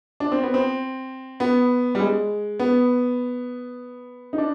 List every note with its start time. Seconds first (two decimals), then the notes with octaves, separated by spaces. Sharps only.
0.20 D4
0.32 C4
0.43 B3
0.54 C4
1.40 B3
1.95 G3
2.00 G#3
2.60 B3
4.33 D#4
4.38 D4